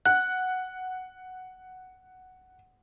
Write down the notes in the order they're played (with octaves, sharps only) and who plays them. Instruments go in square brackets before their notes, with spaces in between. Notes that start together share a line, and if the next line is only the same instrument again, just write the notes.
[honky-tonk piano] F#5 [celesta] F#6